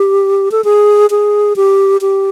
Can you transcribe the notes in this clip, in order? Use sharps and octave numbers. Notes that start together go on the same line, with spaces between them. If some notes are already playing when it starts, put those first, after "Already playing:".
Already playing: G4
A4
G#4
G#4
G4
G4